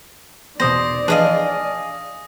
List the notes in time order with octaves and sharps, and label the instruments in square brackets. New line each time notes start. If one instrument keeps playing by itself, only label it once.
[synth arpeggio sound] E2 B2 [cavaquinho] C5 [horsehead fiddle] D5 [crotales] D#6 A#6
[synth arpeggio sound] E3 F3 D4 [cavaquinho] G#4 D#5 F5